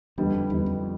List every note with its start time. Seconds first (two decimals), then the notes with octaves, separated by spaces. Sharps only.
0.18 E2 D3 G3 B3 D#4
0.34 F2
0.50 E2 D3 G3 B3 D#4
0.66 F2